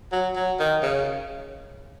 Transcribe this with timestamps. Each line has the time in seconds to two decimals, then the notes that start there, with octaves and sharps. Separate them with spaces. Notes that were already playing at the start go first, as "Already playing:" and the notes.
0.12 F#3
0.36 F#3
0.59 D#3
0.83 C#3